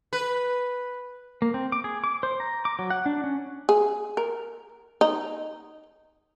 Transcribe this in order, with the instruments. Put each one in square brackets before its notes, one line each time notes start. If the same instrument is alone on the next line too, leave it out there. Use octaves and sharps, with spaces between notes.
[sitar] B4
[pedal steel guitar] A#3
C4
D6
G#4
D6
C5
A#5
D6
F#3
F#5
D4
C#4
[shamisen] G#4
A#4
D#4